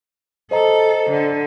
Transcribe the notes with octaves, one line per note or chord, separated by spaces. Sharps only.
A4 C5 D#5 A#5
D3